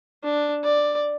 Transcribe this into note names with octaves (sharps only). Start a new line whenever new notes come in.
D4
D5